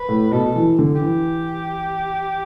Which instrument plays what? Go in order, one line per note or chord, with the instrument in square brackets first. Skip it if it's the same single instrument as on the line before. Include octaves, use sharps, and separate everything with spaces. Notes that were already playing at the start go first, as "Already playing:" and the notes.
Already playing: [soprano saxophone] B4
[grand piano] A2
[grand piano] B2 [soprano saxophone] A4
[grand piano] E3
D3
[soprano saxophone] G4
[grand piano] E3